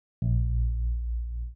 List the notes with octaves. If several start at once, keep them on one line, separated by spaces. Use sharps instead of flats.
A#1